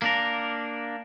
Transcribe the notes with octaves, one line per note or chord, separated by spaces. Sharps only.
A#3 D4 A#4